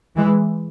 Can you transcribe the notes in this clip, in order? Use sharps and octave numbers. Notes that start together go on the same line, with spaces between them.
E3 G#3